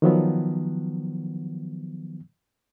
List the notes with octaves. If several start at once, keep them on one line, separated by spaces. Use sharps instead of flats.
D#3 F3 F#3 B3